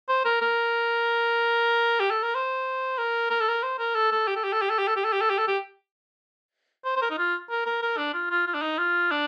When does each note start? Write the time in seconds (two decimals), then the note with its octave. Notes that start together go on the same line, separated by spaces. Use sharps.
0.09 C5
0.25 A#4
0.41 A#4
2.00 G4
2.10 A4
2.23 A#4
2.35 C5
2.98 A#4
3.30 A#4
3.40 A4
3.48 A#4
3.63 C5
3.79 A#4
3.95 A4
4.12 A4
4.27 G4
4.36 A4
4.44 G4
4.53 A4
4.62 G4
4.70 A4
4.78 G4
4.87 A4
4.96 G4
5.05 A4
5.13 G4
5.21 A4
5.30 G4
5.38 A4
5.48 G4
6.85 C5
6.96 C5
7.02 A#4
7.10 D#4
7.18 F4
7.50 A#4
7.66 A#4
7.82 A#4
7.97 D4
8.13 F4
8.30 F4
8.46 F4
8.54 D4
8.62 D#4
8.78 F4
9.11 D4